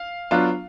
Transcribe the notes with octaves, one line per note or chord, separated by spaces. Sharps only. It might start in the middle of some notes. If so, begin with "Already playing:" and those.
Already playing: F5
F#3 B3 D4 F4